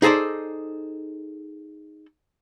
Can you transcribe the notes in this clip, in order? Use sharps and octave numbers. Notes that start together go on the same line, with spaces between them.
D#4 G#4 A4 C5 D5